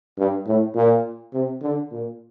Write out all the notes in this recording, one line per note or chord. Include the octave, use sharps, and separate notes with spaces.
G2
A2
A#2
C3
D3
A#2